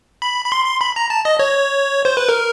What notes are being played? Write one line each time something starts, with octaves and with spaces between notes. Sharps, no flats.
B5
B5
C6
C6
B5
A#5
A5
D#5
C#5
C5
B4
A#4